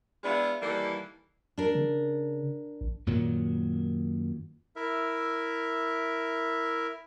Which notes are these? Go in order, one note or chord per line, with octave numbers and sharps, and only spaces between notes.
G#3 B3 D4 E4 F4
D#3 E3 G3 A#3 A4 D5
D4 A#4
C#3
A1
F#2 A#2 D#3 F#3
E4 A#4 E5